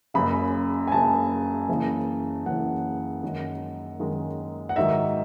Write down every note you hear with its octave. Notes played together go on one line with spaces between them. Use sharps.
F#1 F#2 C#3 B5
G#5
F#1 F#2 C#3 A5
F#1 F#2 C#3 E3
F#1 F#2 C#3 E3 F#5
F#2 D#3 G#3
F#2 D#3 G#3
F#5
G#2 D#3 F#3 E5